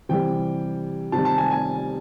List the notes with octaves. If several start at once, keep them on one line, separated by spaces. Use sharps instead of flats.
C3 E3 G3 G5
C3 D#3 G3 A5
A5
G#5
G#5